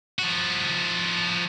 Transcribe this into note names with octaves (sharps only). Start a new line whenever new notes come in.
F3 F#4